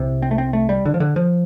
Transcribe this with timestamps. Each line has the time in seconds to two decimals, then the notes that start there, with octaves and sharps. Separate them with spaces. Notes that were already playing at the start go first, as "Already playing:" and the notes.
Already playing: C2 C3
0.22 C4
0.31 A3
0.38 C4
0.53 A3
0.69 G3
0.86 D3
0.94 F3
1.00 D3
1.16 F3